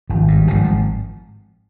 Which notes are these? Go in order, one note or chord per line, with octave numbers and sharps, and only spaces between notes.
G#1 F3
G2
G#1 F3
G3
F3